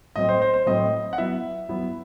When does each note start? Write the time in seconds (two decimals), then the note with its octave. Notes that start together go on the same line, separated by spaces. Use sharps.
0.16 A2 F#3 C4 D#5
0.29 C5
0.42 C5
0.54 C5
0.66 A2 F#3 C4 D#5
1.13 F#5
1.18 F#3 B3 E4 E5
1.69 F#3 B3 E4